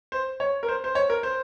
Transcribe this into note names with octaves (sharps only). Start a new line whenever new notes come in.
C5
C#5
A#4
C5
C5
C#5
A#4
C5